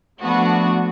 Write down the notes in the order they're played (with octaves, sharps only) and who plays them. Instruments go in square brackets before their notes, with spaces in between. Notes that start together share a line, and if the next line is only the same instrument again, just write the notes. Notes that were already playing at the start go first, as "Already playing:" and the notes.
[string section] F3 A3 B3 D4 F#4